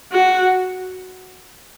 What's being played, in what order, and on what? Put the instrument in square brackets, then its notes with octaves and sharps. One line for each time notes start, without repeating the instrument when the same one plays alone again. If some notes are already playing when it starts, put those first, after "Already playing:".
[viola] F#4